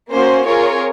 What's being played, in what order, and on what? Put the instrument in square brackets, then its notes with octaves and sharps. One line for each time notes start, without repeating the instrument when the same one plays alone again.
[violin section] A#3 C#4 F#4 C5
C4 F4 G#4 A#4 C#5